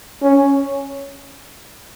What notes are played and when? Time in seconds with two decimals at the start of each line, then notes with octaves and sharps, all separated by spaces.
0.22 C#4